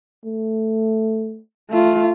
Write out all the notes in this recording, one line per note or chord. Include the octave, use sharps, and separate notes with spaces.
A3
A3 F4